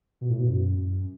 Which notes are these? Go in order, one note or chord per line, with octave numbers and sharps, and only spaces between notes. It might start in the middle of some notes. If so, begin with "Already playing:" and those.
B2
A2
B2
F#2